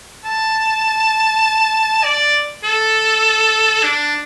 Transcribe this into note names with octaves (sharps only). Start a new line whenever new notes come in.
A5
D5
A4
D4